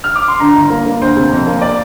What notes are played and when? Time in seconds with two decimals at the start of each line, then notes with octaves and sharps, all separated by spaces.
0.04 F6
0.15 D6
0.28 C6
0.40 D3 A#5
0.56 G1
0.70 A#3
0.86 A#3
1.01 D2 C5
1.17 C3
1.32 F2
1.47 A#3
1.61 D5